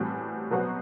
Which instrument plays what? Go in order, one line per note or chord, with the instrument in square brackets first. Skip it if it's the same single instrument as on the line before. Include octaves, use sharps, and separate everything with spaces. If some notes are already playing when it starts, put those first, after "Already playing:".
Already playing: [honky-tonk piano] A2 E3 G3 C4 F#4
B2 F#3 B3 F#4 C5